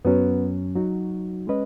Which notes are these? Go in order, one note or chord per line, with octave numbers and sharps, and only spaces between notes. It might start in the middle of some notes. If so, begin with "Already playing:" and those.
F#2 F#3 B3 C#4
F#3 D#4 F#4
G#3 C#4 B4 D#5